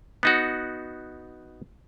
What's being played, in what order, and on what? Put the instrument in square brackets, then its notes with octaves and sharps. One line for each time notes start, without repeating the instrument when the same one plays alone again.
[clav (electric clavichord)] B3 D#4 F#4